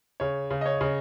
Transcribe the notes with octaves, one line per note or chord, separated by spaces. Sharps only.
C#3 C#5
C#3
D#5
C#5
C#3